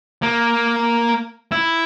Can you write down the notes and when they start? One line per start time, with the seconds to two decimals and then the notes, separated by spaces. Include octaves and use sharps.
0.22 A#3
1.52 E4